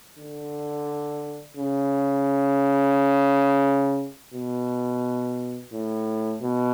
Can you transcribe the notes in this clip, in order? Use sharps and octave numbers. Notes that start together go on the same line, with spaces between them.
D3
C#3
B2
A2
B2